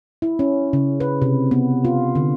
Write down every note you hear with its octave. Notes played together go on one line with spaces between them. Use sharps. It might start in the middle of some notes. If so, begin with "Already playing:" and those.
E4
C#4
C#3
B4
C3
B3
F4
D3